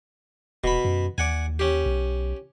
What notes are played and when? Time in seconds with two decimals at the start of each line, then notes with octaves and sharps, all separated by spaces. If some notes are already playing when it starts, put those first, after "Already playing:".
0.64 D#1 B2 B5
0.85 F#2
1.18 D#2 D5 F#5 G#5
1.59 C#4 G4
1.86 B1